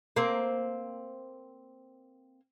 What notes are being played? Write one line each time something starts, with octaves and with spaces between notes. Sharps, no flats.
A#3 C4